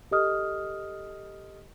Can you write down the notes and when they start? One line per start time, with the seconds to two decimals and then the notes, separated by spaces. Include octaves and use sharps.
0.11 G4 A4 D#5 D#6 F6